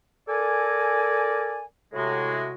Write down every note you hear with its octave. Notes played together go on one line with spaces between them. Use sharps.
A4 A#4 D5 G#5
A2 C3 G#3 F#4